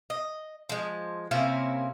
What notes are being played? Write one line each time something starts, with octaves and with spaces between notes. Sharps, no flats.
D#5
F3 G#3
C3 A#3 C#4 E4